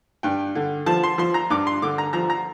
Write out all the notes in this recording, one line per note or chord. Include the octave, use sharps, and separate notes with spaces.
G2 G5
D3
F3 A5
C6
F3 C6
A#5
G2 D6
C6
D3 D6
A#5
F3 A#5
A#5